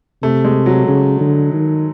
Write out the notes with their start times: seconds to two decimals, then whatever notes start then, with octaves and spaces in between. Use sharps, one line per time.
0.23 C3 A3
0.45 G#3
0.66 F#3
0.88 C#3
1.20 D3
1.53 D#3